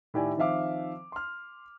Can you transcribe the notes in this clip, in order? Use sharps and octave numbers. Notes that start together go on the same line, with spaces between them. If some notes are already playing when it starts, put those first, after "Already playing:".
A2 D#3 G4 D5 E5 G#5
D#3 F3 C4 E5 F5 D6
C6 F6